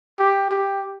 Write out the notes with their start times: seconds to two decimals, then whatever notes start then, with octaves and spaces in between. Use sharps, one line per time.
0.19 G4
0.51 G4